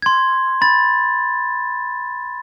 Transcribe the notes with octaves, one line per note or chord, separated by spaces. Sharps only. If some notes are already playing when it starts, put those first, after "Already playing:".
C6 G#6
B5 A6